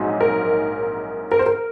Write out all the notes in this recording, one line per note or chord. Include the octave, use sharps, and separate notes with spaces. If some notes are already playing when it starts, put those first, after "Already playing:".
Already playing: A#1 G#2 F#3 C4 D#4
A#4
A#4
C5
A#4